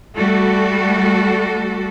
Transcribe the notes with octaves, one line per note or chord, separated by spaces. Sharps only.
G3 A3 F#4 A4